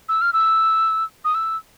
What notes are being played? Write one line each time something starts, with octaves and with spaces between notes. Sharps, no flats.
E6
F6
E6
D#6
E6